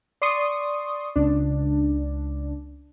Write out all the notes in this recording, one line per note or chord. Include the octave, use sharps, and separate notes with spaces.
D5 C6 C#6 D#6
C#2 D4